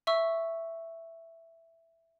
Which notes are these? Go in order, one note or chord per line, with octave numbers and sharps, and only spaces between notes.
E5 C#6 E6